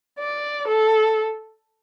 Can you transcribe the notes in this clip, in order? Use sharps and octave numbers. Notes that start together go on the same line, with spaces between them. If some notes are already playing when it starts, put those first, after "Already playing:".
D5
A4